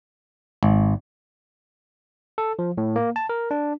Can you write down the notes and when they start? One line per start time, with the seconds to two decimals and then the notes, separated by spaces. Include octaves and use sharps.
0.63 G#1
2.38 A4
2.59 F3
2.78 A2
2.96 A#3
3.16 A5
3.29 A#4
3.51 D4